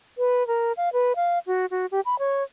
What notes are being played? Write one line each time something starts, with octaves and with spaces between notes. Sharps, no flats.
B4
A#4
F5
B4
F5
F#4
F#4
G4
B5
C#5